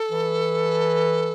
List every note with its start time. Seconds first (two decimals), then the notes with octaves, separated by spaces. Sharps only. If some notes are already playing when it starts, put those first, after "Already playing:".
Already playing: A4
0.11 E3